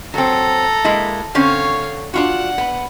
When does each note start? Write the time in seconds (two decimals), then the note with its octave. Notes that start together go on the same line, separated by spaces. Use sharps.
0.14 F#3 C4 A4 A#5
0.84 G#3 A#3 E4
1.35 D3 C4 C#4 C#5 F5
2.14 D4 F4 F#4 F#5
2.58 B3